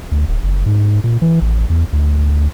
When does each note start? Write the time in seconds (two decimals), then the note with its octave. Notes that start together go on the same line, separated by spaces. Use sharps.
0.12 D2
0.28 D1
0.43 F#1
0.66 G#2
1.04 A#2
1.22 E3
1.42 A1
1.70 E2
1.93 D2
2.30 D2